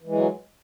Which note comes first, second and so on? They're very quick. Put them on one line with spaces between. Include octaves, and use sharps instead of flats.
E3 G#3 F#3